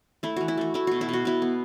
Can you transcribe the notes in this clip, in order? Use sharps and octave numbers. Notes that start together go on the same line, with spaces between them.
A3 E4
E3 F#4
E4
A3 F#4
A3 E4
B2 F#4
E4
B2 F#4
B2 E4
B3